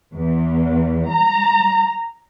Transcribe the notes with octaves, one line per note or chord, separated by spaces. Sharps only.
E2
A#5